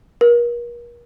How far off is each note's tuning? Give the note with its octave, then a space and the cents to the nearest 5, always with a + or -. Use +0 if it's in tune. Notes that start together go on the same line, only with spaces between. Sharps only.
A#4 +40